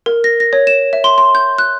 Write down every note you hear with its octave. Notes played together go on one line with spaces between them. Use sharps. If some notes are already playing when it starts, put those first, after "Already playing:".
A#4
A#6
A#6
C#5
E7
E5
C6
C6
G6
F#6